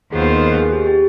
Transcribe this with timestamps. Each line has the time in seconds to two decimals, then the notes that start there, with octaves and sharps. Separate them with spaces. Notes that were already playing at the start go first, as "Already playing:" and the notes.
0.12 D#2 D#3 B3 F4 G#4 C5
0.32 B4
0.52 G#4
0.72 G4
0.87 G4